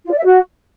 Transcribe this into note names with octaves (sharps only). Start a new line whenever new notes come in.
F4
D5
E5
F#4